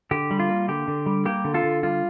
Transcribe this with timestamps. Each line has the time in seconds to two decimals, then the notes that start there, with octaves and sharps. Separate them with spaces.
0.11 D3 G4
0.31 G3
0.40 F4
0.49 A#3
0.68 D3 G4
0.88 D3
1.06 G3
1.25 A#3 G4
1.45 D3
1.54 F4 A4
1.64 D3
1.83 G3 F4